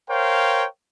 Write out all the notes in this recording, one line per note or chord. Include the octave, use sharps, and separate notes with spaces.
A#4 C5 C#5 F5 G5